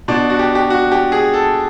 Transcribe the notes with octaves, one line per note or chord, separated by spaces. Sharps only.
B2 D4
F#4
G4
G4
F#4
G4
G#4
A4